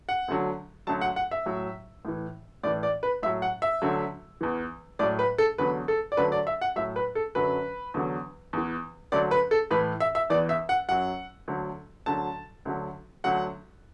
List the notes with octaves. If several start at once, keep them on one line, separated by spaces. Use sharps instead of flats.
F#5
D2 D3 F#3
D2 D3 F#3 A5
F#5
F#5
E5
A2 F#3
A2 E3
A2 E3 D5
D5
B4
A2 F#3 E5
F#5
E5
D2 D3 F#3
E2 E3
A2 F#3 D5
B4
A4
E2 D3 F#3 B4
A4
D5
D2 D3 F#3 B4
D5
E5
F#5
A2 F#3 E5
B4
A4
F#2 D3 F#3 B4
E2 D3 F#3
E2 E3
D2 D3 F#3 D5
B4
A4
A2 E3 B4
E5
E5
E2 E3 D5
E5
F#5
F#2 F#3 F#5
D2 D3 F#3
D2 D3 F#3 A5
D2 D3 F#3
D2 D3 F#3 F#5